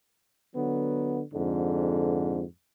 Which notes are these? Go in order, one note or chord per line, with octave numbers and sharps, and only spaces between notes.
D3 F#3 B3
F2 G#2 D3